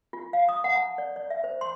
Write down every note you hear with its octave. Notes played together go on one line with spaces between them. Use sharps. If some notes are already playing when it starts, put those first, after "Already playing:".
F4
F5
D#6
F#5
A5
D5
D5
E5
C5
C6